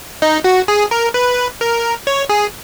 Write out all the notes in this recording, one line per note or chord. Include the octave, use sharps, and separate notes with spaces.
D#4
F#4
G#4
A#4
B4
A#4
C#5
G#4